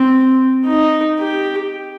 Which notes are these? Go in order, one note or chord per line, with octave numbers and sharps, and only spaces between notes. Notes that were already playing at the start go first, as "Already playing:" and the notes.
Already playing: C4
D#4
G4